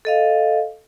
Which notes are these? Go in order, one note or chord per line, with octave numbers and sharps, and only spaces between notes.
A4 D#5 F5